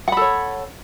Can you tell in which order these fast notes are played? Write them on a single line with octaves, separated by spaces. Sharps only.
F#5 B5 A4 C#5